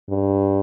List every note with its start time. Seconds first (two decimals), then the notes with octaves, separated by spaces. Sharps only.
0.09 G2